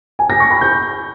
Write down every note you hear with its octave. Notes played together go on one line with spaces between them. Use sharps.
G#5
A#6
C#6
B5
G6